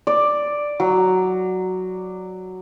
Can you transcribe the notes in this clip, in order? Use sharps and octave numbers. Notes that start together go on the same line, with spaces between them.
D5
F#3